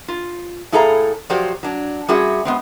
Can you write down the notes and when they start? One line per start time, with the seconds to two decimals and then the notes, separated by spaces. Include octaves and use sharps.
0.08 F4
0.72 A2 E4 G#4 A4 F5 A#5
1.30 F3 F#3 F#4 G4 C5 D5
1.63 F#3 D4
2.08 G3 C4 C#4 F#4 G#4 E5
2.45 G#3 B3 C4